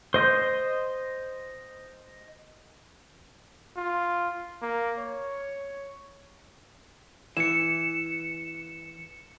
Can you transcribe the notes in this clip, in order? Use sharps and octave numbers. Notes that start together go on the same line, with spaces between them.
C5 D#5 C6 G6
F4
A#3
C#5
E3 C#7 E7